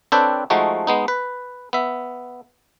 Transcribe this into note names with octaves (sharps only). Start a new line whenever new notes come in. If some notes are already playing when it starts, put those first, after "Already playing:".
C4 D4 A4 B4 C#5 G5
F3 G#3 A3 D#4 F#4
G#3 B3 D#4
B4
B3 E5